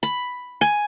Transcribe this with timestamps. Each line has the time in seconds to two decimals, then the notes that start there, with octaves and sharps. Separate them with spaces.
0.03 B5
0.61 G#5